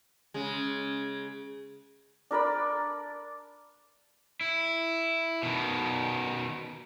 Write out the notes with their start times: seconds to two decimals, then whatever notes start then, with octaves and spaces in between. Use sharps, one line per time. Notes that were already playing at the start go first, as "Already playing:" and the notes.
0.34 C#3 G#3
2.31 D4 A#4 D5 B5
4.41 E4
5.43 B2 D#3